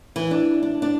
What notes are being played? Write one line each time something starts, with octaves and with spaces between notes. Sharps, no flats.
E3
D4
D4
D4